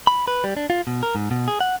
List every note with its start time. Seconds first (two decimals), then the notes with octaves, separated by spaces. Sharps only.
0.07 B5
0.28 B4
0.44 G3
0.57 D4
0.70 F4
0.87 B2
1.03 A#4
1.15 G#2
1.31 B2
1.48 G#4
1.61 F#5